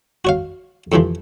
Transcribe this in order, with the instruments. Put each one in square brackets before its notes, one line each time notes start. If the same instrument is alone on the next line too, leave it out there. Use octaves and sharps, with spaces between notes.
[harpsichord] F#4 C#5 F5
F2 A2 C3 E3 F3